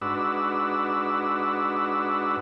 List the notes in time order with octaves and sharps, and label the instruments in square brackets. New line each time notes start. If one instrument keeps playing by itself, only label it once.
[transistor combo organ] G#2 D4 F#4 B4 E6